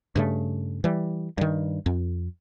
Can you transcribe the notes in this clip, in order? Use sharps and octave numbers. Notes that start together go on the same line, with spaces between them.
G2 C#3 A3
E3 G3
G2 D#3
F2